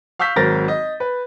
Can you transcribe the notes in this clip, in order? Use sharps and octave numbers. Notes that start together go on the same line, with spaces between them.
F5 C#6 E6 G6 B6
G#1 F#3 A#4 C5 A6 A#6
D#5
B4